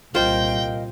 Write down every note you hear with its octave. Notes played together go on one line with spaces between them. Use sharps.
C2 A#2 F4 A#4 C5 D#5 F5 G5